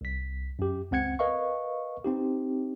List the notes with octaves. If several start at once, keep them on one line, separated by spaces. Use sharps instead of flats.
C2 B6
F#2 G4
C#2 C4 F#5 G#6 C#7
A#4 B4 D#5 F5 C#6
C4 D#4 G4